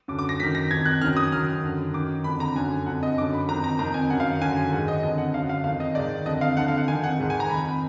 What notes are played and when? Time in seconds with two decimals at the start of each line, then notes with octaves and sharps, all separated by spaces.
0.08 F#2 D3 D6
0.19 D6
0.29 A#6
0.40 F#2 D#3 B6
0.55 A#6
0.71 F2 D#3 G#6
0.86 F#6
1.01 D#3 F6
1.04 F#2
1.17 D#6
1.32 F#2 D#3 F6
1.63 F#2 D3
1.93 F#2 D#3 D6
2.24 F2 D3 B5
2.40 A#5
2.55 F#2 D3 G#5
2.86 F2 D3 F#5
3.03 D#5
3.17 D3 D6
3.21 F#2
3.33 B5
3.49 F2 D#3 A#5
3.64 A#5
3.79 F2 D#3 A#5
3.94 G#5
4.10 F#2 D#3 F#5
4.20 F5
4.30 F#5
4.41 F#2 D3 G#5
4.71 G#2 D#3 F#5
4.88 D#5
5.03 F2 D3 D#5
5.18 F#5
5.33 D3 F5
5.37 F#2
5.49 F5
5.64 F2 D#3 F5
5.80 D#5
5.95 G#2 D#3 D5
6.26 F2 D3 D#5
6.41 F5
6.57 F2 D3 F#5
6.68 F5
6.78 F#5
6.88 D#3 G#5
6.91 F2
7.04 F#5
7.20 G#2 D#3
7.30 G#5
7.40 A#5
7.49 F2 D#3 B5